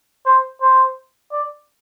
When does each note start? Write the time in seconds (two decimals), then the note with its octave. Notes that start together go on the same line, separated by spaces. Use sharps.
0.26 C5
0.61 C5
1.32 D5